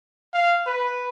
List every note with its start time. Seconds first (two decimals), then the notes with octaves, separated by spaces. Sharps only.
0.34 F5
0.67 B4